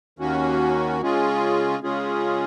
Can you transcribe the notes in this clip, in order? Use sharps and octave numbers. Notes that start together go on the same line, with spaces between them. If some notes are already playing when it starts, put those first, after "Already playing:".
D#2 D#3 A#3 C#4 F#4
C#3 G#3 C#4 F4 G#4
C#3 G#3 C#4 F4 G#4